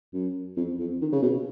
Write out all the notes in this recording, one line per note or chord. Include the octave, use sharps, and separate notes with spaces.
F#2
F2
F2
D#3
C#3
B2